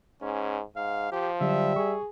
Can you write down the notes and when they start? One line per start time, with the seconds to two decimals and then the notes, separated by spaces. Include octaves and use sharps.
0.22 G#2 C#4
0.76 G#2 F5
1.12 F3 G4
1.41 D3 F#3 G3 E5
1.76 G#4 C#6